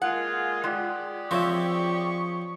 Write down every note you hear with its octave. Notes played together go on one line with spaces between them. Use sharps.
G#3 A#3 F4 G#4 F#5
G#3 F4 G4 G#4 D5 F#5
F3 C4 C#5 E5 C#6